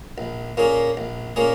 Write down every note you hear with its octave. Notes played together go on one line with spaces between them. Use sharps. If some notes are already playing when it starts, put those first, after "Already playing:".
A#1
A#2 A#3 C#4 G#4
A#1
A#2 A#3 C#4 G#4